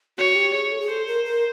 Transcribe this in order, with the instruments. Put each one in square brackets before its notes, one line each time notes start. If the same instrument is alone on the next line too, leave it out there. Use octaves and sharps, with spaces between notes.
[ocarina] F#4 [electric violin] C#5
[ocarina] G4
[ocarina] G#4 [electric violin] C#5
[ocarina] A4
G#4
[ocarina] A4 [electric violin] C5
[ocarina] A#4
A#4